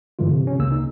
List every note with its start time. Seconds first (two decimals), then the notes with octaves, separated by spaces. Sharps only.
0.19 G2 D3 E3 G#3 F4
0.31 C3
0.47 C3 C#4
0.59 C#2 C#3 A#3 E6
0.72 D#4